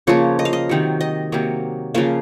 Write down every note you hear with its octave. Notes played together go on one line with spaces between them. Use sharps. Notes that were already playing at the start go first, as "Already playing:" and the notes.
C#3 F3 A#3 C#5
D#5
F5
D#5
C3 D#3 F#3
D#5
C3 F#3 A#3
C#3 F3 A#3 F5